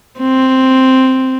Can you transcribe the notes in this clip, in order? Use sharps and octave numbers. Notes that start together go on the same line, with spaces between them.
C4